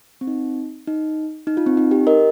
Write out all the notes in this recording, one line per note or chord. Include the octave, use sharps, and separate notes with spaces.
C4
D#4
D#4
D#4
F4
C4
D#4
G4
A#4 D#5